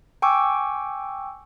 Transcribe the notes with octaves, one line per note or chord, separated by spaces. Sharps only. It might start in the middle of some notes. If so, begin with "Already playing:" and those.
G5 G#5 C#6 D6 E6